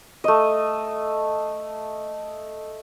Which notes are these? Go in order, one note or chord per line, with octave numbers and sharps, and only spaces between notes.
A3 D#5